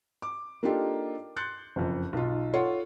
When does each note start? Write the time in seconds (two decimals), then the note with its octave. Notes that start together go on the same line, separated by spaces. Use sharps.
0.22 D6
0.63 A#3 D4 D#4 F4 G4 A4
1.36 C6 F#6 G6 A6 C#7
1.76 F#1 F2
2.13 B1 D#4 F4
2.53 F4 A4 C#5 F#5 C6